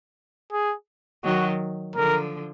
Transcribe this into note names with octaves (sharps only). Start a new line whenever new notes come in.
G#4
D#3 F#3 F#4
D3 F3 A#4